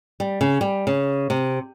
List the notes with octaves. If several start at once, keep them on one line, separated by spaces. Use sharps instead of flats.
G3
C#3
G3
C#3
C3